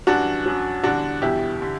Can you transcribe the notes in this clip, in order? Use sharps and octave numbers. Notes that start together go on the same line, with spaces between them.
F#2 E3 G3 D4 F#4
F#2 F#3
E2 D3 G3 D4 F#4
E2 B2 G3 E4 G4
D3 G3